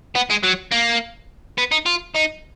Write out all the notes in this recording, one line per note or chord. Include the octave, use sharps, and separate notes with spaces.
B3
G#3
F#3
A#3
B3
D#4
F4
D#4